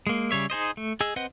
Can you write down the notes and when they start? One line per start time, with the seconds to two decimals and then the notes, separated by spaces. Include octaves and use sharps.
0.07 G#3 A#3
0.31 C#3 G3 C#5 E5
0.50 D#4 G#4 C5 D#5
0.77 A3
1.01 G#4 D#5 E6
1.16 C4 B4 C5 D#5 F#5